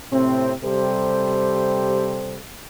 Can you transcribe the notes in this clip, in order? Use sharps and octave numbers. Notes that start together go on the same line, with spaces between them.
A2 C3 C4
C3 G3 G4 A4 C5